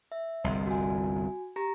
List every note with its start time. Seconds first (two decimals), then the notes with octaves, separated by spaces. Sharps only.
0.12 E5
0.44 G1 C2 D#5 C6
0.66 F#4 G#5
1.56 G4 A#5 A#6